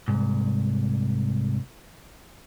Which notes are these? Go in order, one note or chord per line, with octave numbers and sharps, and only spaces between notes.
C2 G#2